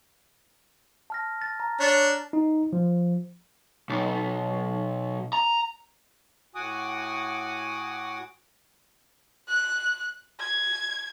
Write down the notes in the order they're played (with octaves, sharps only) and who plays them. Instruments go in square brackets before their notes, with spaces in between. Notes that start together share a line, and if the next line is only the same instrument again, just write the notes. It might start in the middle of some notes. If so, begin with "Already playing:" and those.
[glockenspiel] A5 F6 A#6
A6
A#5
[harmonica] D4 C#5 [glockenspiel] F#6
[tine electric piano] D#4
F3
[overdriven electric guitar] B1
A#5
[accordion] A2 F#4 F#5 G#5 D6 D#6
[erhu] F#6
G#6